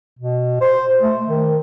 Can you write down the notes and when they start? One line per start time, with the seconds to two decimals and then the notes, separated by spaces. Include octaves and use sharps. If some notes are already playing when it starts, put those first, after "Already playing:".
0.19 B2
0.61 C5
1.01 A3
1.27 D#3